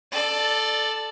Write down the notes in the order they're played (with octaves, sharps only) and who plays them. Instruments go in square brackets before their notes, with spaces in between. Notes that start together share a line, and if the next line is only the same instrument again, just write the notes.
[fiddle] A4 D5